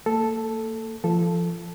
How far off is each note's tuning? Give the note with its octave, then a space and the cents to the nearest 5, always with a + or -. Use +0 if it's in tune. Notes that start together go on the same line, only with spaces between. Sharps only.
A#3 -40 A4 +0
F3 -25 A4 -5